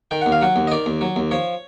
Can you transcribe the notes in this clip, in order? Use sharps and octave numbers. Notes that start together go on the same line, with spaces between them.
D#3 G5
D#2 F#5
F5
F#3 F#5
D#2
D#5
D#3 D5
D#2
F#3
D#2
F3 C#5